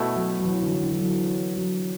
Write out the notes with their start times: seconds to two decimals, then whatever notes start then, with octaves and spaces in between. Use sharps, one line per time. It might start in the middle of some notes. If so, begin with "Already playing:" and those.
Already playing: B2 A3 E4
0.16 F#3
0.40 F#3
0.45 E3
0.63 D3
0.72 E3
0.83 D3
0.92 E3
1.01 F#3
1.57 F#3